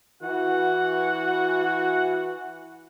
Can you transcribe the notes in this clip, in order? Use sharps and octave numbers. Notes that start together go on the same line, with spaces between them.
E3 F#4 F#5